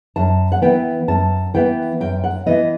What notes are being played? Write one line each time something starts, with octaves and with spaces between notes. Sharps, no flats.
F#2 A5
F#5
E3 B3 G5
F#2 A5
E3 B3 G5
F#2 G5
F#5
E3 B3 D#5